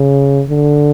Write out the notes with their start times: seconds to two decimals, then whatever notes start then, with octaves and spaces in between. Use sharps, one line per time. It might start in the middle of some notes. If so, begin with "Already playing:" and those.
Already playing: C#3
0.49 D3